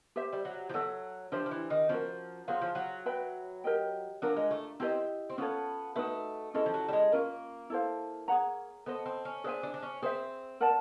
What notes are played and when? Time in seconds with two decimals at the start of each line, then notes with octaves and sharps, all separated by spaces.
0.16 G4 C5 E5
0.32 G3
0.45 F#3
0.69 F3
0.74 F#3 A4 C#5 E5
1.32 F3 D4 G4 C5 E5
1.46 F3
1.51 E3
1.70 D#3
1.89 F3 C#4 F#4 A#4
2.48 F#3 F4 G#4 C5 F5
2.61 F3
2.75 F#3
3.06 B4 E5 G5 B5
3.64 G4 A#4 D#5 G5
4.22 F#3 D4 F4 A#4
4.36 G#3
4.51 A3
4.80 C4 E4 G4 A#4 D#5
5.29 C4
5.38 B3 C#4 F4 A4 C#5
5.96 A3 D#4 F#4 B4 E5
6.54 G#3 C#4 E4 A4
6.66 F3
6.74 F#3
6.88 G3
6.93 G#3
7.12 A#3 C#4 F4 A#4
7.70 E4 A4 C5 F5
8.28 G#4 C#5 F#5 A#5
8.86 B3 A4 C5 D#5
9.06 C4
9.25 C#4
9.44 D4 G#4 C5 E5 G#5
9.63 D4
9.74 D4
9.82 C#4
10.02 C4 G#4 C5 E5
10.60 A#4 D5 F#5 A5